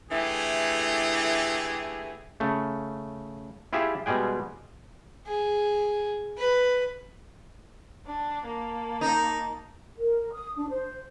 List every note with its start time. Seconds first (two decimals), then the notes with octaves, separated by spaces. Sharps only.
0.10 D3 E3 A3 E4 G4 G#4
2.40 C#3 A3
3.73 E4 F4 G4 G#4 E5
4.06 B2 G3 G#3 G#4 G5
5.27 G#4
6.38 B4
8.07 D4
8.46 A#3 A5
9.01 D#4
9.98 A#4
10.33 D#6
10.56 D4
10.70 C5